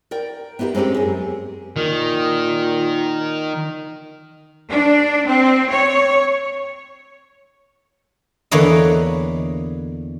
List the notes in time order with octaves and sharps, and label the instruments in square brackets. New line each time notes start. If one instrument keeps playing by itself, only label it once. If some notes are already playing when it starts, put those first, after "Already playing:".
[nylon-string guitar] A#4 D5 G5
B3 D4 E4 G4 A#4
G#3 C4 C#4 F#4 G4
F#2 G#4
[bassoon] A#2 [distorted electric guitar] D#3
[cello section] D4
C4
C#5
[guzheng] E2 D3 A#3 B4 C#5 D#5